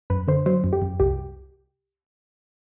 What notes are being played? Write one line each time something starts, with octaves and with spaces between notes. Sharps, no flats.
F#2 B4
D3 C5
F#3 C5
F#2
G4
F#2
C2 G4